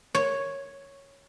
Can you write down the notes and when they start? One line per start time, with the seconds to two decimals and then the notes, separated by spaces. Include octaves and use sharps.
0.15 C#5